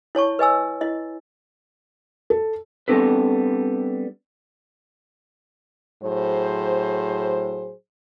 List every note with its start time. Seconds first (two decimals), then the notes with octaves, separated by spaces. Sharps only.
0.15 E4 C#5 A5 C#6
0.39 B4 D#5 G#5 E6
0.81 E4 D#5
2.30 A4
2.88 G3 B3 C4 D4 A4 B4
6.03 A2 F#3 G#4 C5